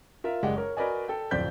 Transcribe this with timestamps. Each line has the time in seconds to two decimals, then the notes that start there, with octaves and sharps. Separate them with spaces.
0.24 F4 A#4 E5
0.43 F#1 G#3 G4 D5 F#5
0.56 A#4 C#5
0.77 F#4 A#4 B4 D5 D#5 G#5
1.08 A4 G5
1.31 D1 F2 C4 D5 G6 B6